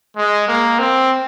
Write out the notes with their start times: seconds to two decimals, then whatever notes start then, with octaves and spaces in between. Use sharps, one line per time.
0.17 G#3
0.48 A#3
0.79 C4